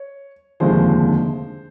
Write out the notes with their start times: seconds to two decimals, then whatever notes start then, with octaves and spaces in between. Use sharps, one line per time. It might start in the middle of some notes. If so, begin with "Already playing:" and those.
Already playing: C#5
0.60 F1 D#2 D3 F3 G#3 C5